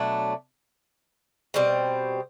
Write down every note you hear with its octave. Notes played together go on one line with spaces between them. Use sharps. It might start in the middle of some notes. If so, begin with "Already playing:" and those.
Already playing: B2 F#3 A3 D4
B2 G3 C4